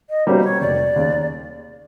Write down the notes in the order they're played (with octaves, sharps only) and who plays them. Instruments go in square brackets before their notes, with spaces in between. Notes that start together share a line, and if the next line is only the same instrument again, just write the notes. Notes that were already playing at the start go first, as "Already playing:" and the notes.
[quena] D#5
[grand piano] B2 G3 A#3 C#4 [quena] C5
[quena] C#5
[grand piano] F1 [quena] D5
[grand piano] D#2 C#3